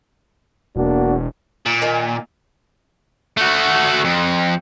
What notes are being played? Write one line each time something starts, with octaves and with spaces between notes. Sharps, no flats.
E1 A#3 D4 F#4
A#2
D#3 G#5
A3 F#4
F2